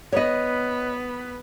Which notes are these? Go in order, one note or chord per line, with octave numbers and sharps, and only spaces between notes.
B3 B4 C#5 D#5